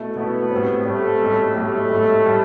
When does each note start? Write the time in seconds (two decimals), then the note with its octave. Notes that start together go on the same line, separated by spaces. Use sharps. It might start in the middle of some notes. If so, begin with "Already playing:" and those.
Already playing: B2 A3 E4 A4
0.16 B2 A3 B3 E4 A4
0.51 A2 G3 C4
0.86 A2 G3 A3 C4
1.21 B1 A2 G3
1.56 B1 A2 G3 A3
1.90 B1 A2 G3
2.26 A2 G3